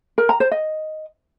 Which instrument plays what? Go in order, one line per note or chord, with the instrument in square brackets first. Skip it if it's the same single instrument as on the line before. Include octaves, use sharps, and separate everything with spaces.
[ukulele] A#4
A#5
C5
D#5